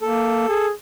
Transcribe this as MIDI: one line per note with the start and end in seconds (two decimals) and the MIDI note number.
0.01 0.46 58
0.01 0.67 69
0.48 0.71 68